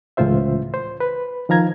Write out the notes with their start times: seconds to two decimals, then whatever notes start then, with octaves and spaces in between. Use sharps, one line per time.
0.17 C#2 A2 E3 F4 C5 E5
0.74 C5
1.00 B4
1.49 D#3 F3 F5 A#5 G#6